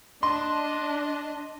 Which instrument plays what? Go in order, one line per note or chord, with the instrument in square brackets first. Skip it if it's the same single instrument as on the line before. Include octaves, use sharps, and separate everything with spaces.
[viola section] D4 [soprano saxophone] D#5 [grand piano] C6